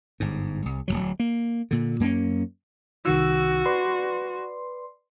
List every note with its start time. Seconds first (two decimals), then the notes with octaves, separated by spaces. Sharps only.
0.20 G1 G#2
0.66 C2
0.88 D1 C#2 F#3
1.20 A#3
1.71 A#2 D3
2.00 F#2 A#3 B3 C#4
3.05 C2 D#3 F#4 E6
3.66 B4 D5 C6